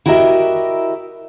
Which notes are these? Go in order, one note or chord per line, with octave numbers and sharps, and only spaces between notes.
E4 F#4 G4 A#4 D#5 E5